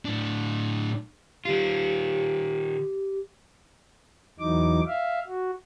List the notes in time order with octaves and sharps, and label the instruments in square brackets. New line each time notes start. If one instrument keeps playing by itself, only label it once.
[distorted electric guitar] A2 D4
[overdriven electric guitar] D#3 F4 [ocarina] G4
[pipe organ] E2 E3 F#3 D#4 D6
E5 F5
F#4